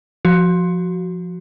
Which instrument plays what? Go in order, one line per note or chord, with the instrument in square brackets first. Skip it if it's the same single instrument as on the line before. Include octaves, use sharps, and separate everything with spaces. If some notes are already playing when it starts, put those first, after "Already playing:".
[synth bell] F3 F#4